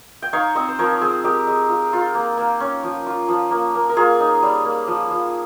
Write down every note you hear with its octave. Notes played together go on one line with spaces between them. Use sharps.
G5
D#4 C#5 F5
C4 C5 D#5
C5
F3 A#4 C#5
C#5
C4 G#4 C5
G#3 G4 A#4
G#3
F4
F4
A#3
A#3
C#4
F3
F4
F3
A#3
A#3
A#4
A#3 F4 G#4
D#4
G3
A#3
F3
F3